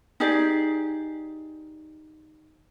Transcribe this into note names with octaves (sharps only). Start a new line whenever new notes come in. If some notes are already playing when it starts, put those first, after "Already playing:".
D#4 G4 G#4 D5